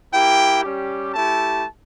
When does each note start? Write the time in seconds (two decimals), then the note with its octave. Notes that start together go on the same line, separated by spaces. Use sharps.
0.14 A#3 E4 G4 G5
0.64 G3 C#4 G4
1.14 A3 E4 G4 A5